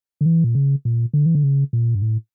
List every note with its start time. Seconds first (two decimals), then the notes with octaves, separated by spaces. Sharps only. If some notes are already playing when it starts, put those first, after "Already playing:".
0.21 D3
0.26 E3
0.44 A#2
0.55 C#3
0.85 A#2
1.13 D3
1.26 E3
1.35 D3
1.43 C#3
1.73 A#2
1.95 G2
2.02 A2